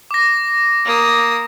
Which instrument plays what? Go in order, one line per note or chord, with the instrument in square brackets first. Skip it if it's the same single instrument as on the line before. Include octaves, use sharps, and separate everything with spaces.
[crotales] D6 A#6
[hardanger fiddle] A#3 D#6